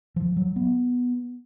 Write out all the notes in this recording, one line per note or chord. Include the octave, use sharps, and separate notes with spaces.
F3
F#3
B3